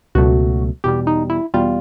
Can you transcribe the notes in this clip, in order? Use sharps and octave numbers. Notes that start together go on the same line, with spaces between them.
C#2 B2 F#3 A3 F#4
E2 B2 G3 G4
D#4
E4
E2 B2 G3 F4